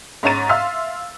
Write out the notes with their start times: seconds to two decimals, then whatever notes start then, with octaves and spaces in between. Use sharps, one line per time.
0.23 G#2 C#4 C#5 A#5 A6 D#7
0.49 E5 F5 C6 E6 F6